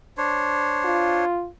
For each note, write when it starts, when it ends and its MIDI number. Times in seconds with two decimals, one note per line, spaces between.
0.18 1.25 62
0.18 1.25 72
0.18 1.25 73
0.84 1.47 65